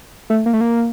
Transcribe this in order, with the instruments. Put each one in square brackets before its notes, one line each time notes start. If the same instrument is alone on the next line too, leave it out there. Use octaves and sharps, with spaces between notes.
[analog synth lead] A3
A#3
A3
A#3